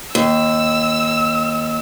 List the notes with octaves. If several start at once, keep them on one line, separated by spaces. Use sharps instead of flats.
D#2 E6